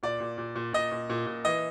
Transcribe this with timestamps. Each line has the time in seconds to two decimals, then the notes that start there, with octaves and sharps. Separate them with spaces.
0.03 A#2 D5
0.20 A#2
0.38 A#2
0.56 A#2
0.73 A#2 D#5
0.92 A#2
1.10 A#2
1.26 A#2
1.45 E3 D#5